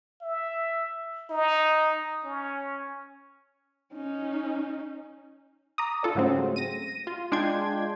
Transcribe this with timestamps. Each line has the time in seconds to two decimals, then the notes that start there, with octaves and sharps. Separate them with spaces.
0.22 E5
1.30 D#4
2.24 C#4
3.94 C#4 D#4
5.78 A#5 D6 D#6
6.03 F4 A4 D5
6.15 G#2 C#3 F#3 A3 C4 C#4
6.56 A#6 D#7
7.07 F4
7.32 G#3 D4 F4 G5 C6 G#6